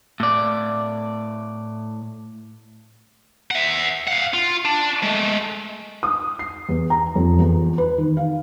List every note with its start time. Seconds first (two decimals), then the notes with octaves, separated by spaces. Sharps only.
0.20 A2 D5
3.51 E5 F#5
4.07 F5 F#5
4.34 F4
4.65 D4
5.03 G#3 A3
6.03 D#6
6.39 C7
6.69 E2
6.90 A#5
7.16 F2
7.39 E2
7.78 B4
7.98 D#3
8.17 F5